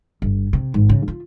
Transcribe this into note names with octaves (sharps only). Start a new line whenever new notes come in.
G1
C3
G#1
C#3
F4